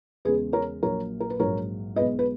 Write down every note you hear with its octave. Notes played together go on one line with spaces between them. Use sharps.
E2 C#3 G#3 G#4 B4
A#4 C#5
A#1 A#2 F#3 A#4 C#5
A#4
B4
A#1 G#2 F#3 A#4 C#5
B1 B2 G#3 B4 D#5
B4